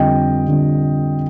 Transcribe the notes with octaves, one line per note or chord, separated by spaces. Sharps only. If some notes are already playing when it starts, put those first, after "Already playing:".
Already playing: F2 D3 G3 D#5 G5
F2 D3 G3